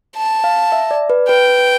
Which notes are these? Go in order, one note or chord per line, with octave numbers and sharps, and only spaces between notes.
A5
F5
E5
D5
B4
B4 G5